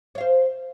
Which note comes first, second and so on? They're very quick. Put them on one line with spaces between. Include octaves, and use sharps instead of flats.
C#5 F5 C5